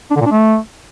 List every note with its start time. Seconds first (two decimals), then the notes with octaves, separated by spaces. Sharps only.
0.11 D4
0.16 D3
0.21 A#2
0.26 D4
0.31 A3